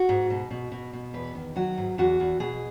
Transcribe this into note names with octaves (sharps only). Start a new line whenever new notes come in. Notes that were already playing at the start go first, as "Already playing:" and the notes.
Already playing: F#4
G#2
B2
B2
B2
B2
E2 B4
D#3
F#3 F#4
G#2
E2 F#4
E2
B2 G#4